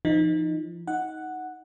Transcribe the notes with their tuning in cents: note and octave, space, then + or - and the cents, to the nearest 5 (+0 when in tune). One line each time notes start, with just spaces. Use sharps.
F3 -35 D#4 -5
D#4 +15 F#5 +0